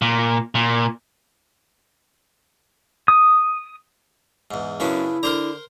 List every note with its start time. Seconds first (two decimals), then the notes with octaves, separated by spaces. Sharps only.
0.02 A#2
0.55 A#2
3.08 D#6
4.51 E2 G#2
4.80 F#2 C#3 B3 D4 E4
5.23 D3 A#4 C5 A#5